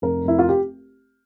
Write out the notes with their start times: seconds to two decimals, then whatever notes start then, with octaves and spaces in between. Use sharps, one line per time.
0.02 F1 A#4
0.25 F1 E4
0.39 F4
0.49 G4